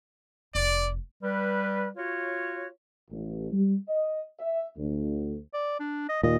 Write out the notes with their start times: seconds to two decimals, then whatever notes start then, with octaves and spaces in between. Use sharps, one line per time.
0.55 F1 D5
1.22 G3 B4
1.96 F4 F#4 C#5
3.10 A1
3.52 G3
3.88 D#5
4.39 E5
4.77 D2
5.54 D5
5.80 D4
6.09 D#5
6.23 D#2 A#2 D#5